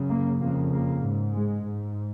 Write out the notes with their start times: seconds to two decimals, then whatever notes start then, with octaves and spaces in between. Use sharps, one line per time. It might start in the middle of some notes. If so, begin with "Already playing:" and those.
Already playing: F#2 C#3
0.10 A#3
0.40 F2 C#3 A#3
0.72 A#3
1.03 G#2
1.34 G#3
1.65 G#2